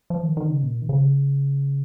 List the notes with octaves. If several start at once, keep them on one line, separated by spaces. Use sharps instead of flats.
F3
D#3
D#3
C#3
A#2
D#3
C#3